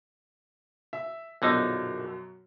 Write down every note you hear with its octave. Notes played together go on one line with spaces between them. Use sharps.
E5
A#1 F#2 B2 D3 D#4 D#5 E5